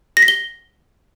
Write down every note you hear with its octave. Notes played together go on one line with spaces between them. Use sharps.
A#6
B6
G7